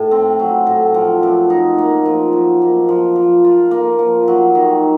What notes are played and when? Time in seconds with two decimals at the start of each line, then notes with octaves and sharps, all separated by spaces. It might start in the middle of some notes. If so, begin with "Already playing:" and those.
Already playing: A2
0.11 C4
0.40 F#3
0.67 A2
0.94 F3
1.23 F#2
1.50 D#4
1.78 A#3
2.06 F3
2.33 F#2
2.62 A#3
2.89 F3
3.16 F3
3.45 F4
3.71 A#3
3.99 F3
4.28 F#3
4.55 D#3